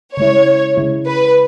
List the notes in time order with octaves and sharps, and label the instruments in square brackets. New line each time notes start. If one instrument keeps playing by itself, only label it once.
[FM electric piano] C#3 G#3 E4 [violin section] C#5
[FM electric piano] C#3 G#3 E4
[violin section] B4